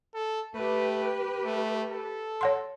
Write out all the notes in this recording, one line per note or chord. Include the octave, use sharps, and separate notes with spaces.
A4
A3 G4 B4
A3
A4
C#5 F#5 C6